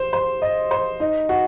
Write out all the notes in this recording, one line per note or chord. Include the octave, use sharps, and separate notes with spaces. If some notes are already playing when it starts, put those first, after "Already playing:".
Already playing: C5
C5
D#5
C5
D#4
F#4